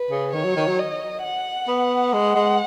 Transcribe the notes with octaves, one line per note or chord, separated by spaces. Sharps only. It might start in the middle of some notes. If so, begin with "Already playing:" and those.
Already playing: B4
C#3
D#3 C#5
F#3
D#3
F#3
D#5
F#5
B3
G#3 F#5
G#3